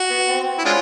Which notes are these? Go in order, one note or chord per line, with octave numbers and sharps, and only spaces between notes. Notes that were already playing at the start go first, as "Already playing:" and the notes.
Already playing: F#4
B3
C4
E4
G#3 C#4 D4 F4